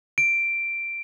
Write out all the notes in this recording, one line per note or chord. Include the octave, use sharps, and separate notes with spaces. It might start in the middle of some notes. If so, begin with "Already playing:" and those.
D7